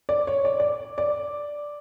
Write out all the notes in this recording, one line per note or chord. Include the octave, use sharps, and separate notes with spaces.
D5
C#5
D5
D5
D5